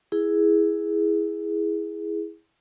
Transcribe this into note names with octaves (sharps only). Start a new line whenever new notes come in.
E4 G#4